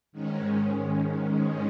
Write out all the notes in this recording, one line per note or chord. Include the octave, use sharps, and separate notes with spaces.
G#2 D#3 G#3 C#4